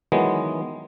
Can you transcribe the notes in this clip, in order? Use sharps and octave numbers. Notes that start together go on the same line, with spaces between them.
D#3 E3 F#3 G#3 B3